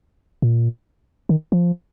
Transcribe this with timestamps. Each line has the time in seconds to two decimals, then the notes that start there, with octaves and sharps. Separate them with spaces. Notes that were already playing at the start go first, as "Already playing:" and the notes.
0.42 A#2
1.29 D#3
1.52 F3